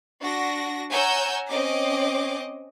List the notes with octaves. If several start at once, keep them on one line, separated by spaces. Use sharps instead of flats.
D4 F#4 A#6
C#5 F#5 G#5 A#5 E6 G6
C4 C#4 D#5 D6